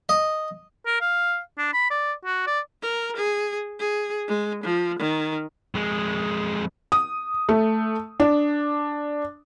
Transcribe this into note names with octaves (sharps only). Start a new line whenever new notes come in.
D#5
A#4
F5
D4
B5
D5
F#4
D5
A#4
G#4
G#4
G#3
F3
D#3
F2 G#3
D#6
A3
D4